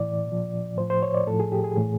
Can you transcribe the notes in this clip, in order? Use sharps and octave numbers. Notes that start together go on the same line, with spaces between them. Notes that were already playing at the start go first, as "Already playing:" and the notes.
Already playing: A2 E3 D5
A#2 F3
A2 F3 C5
C5
C#5
D5
A2 F3 A4
G#4
G4
G#4
A2 E3